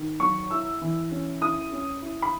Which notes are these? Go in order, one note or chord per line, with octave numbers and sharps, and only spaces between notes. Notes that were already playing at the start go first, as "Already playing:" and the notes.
Already playing: D#3
F#3 C#6
E4 E6
E3
C#4
E4 D#6
C#4
E4
B5